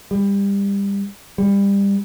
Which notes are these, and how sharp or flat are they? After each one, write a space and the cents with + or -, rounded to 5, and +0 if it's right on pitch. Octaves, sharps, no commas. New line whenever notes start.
G3 +25
G3 +25